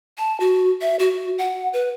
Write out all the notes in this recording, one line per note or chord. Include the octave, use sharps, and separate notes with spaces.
A5
F#4
E5
F#4
F#5
B4